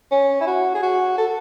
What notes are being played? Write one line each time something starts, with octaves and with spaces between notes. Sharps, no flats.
C#4
E4
F#4
G#4
F#4
A4